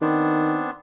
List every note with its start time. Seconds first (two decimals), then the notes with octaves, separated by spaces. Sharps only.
0.01 D#3 B3 C4 D4